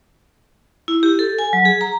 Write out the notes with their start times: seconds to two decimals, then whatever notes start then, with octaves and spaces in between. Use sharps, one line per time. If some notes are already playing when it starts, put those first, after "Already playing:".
0.88 E4
1.03 G4
1.19 A4
1.39 G#5
1.53 F#3
1.65 G#4
1.81 A#5